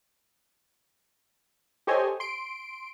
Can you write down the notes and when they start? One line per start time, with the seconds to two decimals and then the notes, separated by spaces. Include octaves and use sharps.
1.87 G4 A4 C5 C#5 D#5 G#5
2.20 C6 D7